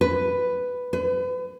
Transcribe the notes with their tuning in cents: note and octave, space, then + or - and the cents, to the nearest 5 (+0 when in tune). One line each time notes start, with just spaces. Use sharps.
B4 +5
B4 +35